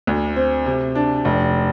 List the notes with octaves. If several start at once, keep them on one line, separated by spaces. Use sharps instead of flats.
D2
C4
C3
D4
F1